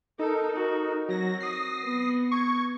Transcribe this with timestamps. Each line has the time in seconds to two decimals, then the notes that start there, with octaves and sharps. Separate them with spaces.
0.19 D#4 A4 A#4
0.55 F#4 A#4
1.09 F#3 C4 F#4 A#6
1.40 D#6 A#6 C7
1.84 B3
2.32 C#6 G#6